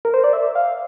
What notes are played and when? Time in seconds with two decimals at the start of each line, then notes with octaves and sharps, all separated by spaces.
0.05 A#4
0.14 C5
0.24 D5
0.33 E5
0.55 F5